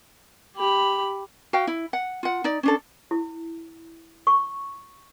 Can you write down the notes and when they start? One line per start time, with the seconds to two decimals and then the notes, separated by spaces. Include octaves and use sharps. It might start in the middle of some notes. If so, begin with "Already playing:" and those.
0.57 G4 B5
1.53 F#4 F5 G5
1.67 E4
1.93 F#5
2.23 F4 F#5
2.44 D#4 D5
2.63 C#4 D4 A4
3.11 E4
4.27 C#6